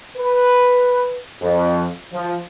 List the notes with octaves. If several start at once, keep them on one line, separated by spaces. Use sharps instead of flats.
B4
F2
F3